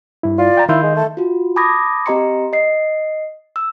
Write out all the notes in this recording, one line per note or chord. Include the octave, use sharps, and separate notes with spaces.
G2 E4
F4 D5
G5 A#5
D#3 E4 F5 C6 G6
G#3
A3 A5
F4 F#4
A5 B5 D6 D#6 G#6 A#6
C4 G4 D#5 A#5 C6 C#7
D#5 C7
E6